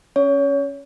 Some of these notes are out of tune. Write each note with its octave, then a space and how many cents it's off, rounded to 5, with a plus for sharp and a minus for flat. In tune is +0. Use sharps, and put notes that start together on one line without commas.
C#4 +0 C#5 +25